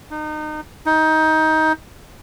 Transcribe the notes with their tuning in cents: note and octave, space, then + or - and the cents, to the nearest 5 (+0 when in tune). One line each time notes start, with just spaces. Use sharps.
D#4 -30
D#4 +20